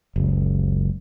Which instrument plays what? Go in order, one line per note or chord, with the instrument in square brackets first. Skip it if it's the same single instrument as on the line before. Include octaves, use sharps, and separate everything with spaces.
[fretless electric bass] F#1 C#2